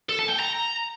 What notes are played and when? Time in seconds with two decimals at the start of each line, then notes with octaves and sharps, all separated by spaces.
0.09 A4
0.19 A5
0.29 G5
0.39 A#5